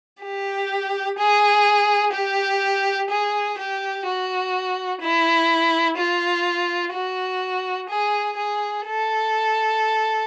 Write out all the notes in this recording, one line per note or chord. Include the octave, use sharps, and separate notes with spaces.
G4
G#4
G4
G#4
G4
F#4
E4
F4
F#4
G#4
G#4
A4